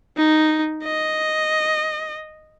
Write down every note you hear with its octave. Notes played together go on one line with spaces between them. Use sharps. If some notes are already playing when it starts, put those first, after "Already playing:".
D#4
D#5